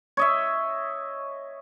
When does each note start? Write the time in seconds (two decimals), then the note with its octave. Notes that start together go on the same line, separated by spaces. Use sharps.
0.17 C#5 D#5 E5